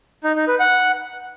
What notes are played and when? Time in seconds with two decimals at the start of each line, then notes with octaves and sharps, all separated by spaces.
0.24 D#4
0.36 D#4
0.48 B4
0.60 F#5